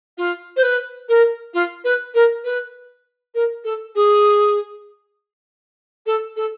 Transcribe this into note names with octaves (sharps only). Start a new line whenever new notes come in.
F4
C5
B4
A#4
F4
B4
A#4
B4
A#4
A4
G#4
A4
A4